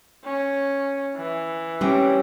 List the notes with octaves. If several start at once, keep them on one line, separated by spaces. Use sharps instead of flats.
C#4
E3
G3 C4 C#4